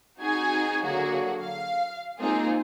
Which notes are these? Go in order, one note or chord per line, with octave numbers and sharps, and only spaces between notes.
C4 D#4 F#4 G#4 G#5
D3 F#3 A#3 F#4 G#4
F5
G#3 A#3 C4 D#4 F4 G#4